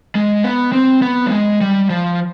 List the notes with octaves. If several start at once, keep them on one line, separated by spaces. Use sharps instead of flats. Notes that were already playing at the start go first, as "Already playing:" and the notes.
G#3
B3
C4
B3
G3
G#3
G3
F3